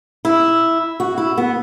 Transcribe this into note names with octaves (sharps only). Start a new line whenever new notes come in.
E4
F#4
E4
B3